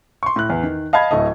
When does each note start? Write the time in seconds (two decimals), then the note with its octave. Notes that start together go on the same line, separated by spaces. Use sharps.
0.23 C6 C#6
0.36 A2 F#6
0.50 E2
0.63 D#3
0.93 D#5 F5 A5 B5 G#6
1.11 D1 A3 D#5